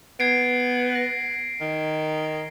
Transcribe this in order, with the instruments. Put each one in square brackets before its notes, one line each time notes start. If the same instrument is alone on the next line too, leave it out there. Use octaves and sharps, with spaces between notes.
[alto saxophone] B3 [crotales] G#6 C7 D7
[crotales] A#6
[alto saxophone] D#3